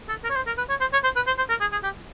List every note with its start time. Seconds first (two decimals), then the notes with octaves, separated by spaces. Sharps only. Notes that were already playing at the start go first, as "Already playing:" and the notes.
0.09 A4
0.24 A#4
0.30 C#5
0.36 C5
0.47 A#4
0.58 B4
0.69 C#5
0.80 C5
0.93 C#5
1.04 C5
1.16 B4
1.27 C5
1.38 C5
1.49 A#4
1.60 G#4
1.72 G#4
1.83 G4